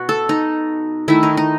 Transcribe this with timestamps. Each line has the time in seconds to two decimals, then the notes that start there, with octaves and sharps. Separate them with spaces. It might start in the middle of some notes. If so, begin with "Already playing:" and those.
Already playing: B2 F#4
0.09 A4
0.29 D#4
1.08 D#3 A3 E4
1.23 D#4
1.37 D#4